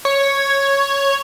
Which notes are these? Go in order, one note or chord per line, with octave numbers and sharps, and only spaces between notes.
C#5